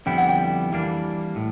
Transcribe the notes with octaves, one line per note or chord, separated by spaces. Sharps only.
F2 D3 G3 B3 E4 G5
F#5
G5
E3 G3 A#3 D4
A2